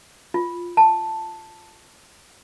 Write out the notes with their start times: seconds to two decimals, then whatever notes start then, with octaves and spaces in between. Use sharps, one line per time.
0.34 F4
0.77 A5